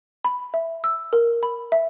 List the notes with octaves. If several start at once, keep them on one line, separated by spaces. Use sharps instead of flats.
B5
E5
E6
A#4
B5
E5